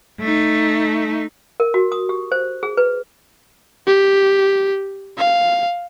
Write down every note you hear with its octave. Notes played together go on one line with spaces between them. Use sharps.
A3 D#4
A#4
F#4
D#6
G4
C5
G#4
B4
G4
F5